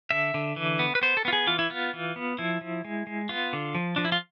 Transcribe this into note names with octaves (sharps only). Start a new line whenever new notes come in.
D3 E5
D3
E3
B3
B4
B3 C5
A4
B3 F4
G#4
E3 F4
E4
B3 F4
E3
B3
F3 E4
F3
G#3
G#3
B3 F4
D3
F3
F3 D4
E4
F4